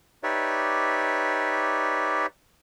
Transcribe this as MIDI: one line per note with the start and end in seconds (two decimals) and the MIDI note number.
0.23 2.26 63
0.23 2.26 67
0.23 2.26 71
0.23 2.26 73
0.23 2.26 74
0.23 2.26 76